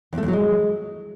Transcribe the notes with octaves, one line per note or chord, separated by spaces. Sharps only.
E2
A3
E2
F#3
G#3